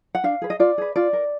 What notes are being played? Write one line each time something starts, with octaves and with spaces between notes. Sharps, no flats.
F#5
D4 F5
G#4 B4
D#5
F4 D5
G#4 B4
F4 D5
A#4